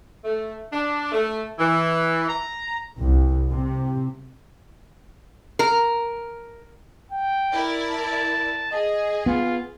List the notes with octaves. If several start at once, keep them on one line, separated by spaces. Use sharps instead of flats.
A3
D4
A3
E3
A#5
C2
C3
A#4
G5
E4 A#4 D5
A5
G#4 D#5
B3 F4